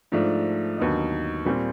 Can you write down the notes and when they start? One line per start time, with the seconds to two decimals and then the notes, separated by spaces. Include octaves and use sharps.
0.12 G#2 F3 A3 D4
0.78 D#2 D3 F#3 B3 D#4
1.45 A#2 G3 C4